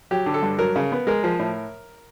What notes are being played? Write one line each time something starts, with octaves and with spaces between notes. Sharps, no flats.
F#3 G4
D3
A4
G2
F#3 A#4
C#3
B3
G#3 A#4
F3
A2